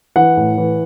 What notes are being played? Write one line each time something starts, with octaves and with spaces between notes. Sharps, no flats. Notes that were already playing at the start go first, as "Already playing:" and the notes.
E3 F#5
A2
E3